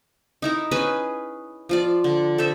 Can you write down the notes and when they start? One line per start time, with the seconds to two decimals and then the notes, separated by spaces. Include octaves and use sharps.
0.42 D#4 E4 A#4
0.71 C#4 G#4 B4 G#5
1.69 F3 F4 D5
2.04 D3
2.38 A4 C5 E5